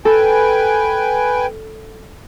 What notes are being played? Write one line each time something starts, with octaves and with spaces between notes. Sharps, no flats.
A4 B4 G5 G#5